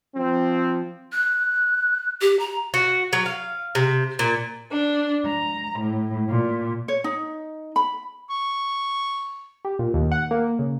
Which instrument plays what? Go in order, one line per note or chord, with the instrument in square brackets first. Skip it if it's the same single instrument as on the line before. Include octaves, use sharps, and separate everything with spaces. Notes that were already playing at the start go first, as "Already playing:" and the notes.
[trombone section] F3 C4
[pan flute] F#6
G4
A#5
[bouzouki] F#4
F#3
F5
C3
A#2
[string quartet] D4
A#5
A2
A#2
[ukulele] C#5
D#4
B5
[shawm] C#6
[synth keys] G4
A#2
D#2
F#5
A#3
C#3